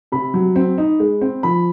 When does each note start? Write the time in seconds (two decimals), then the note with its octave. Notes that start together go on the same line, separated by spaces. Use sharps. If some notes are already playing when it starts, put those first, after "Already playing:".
0.12 C3 B5
0.34 F#3
0.56 C4
0.78 D#4
1.00 G#3
1.21 C4
1.43 F3 B5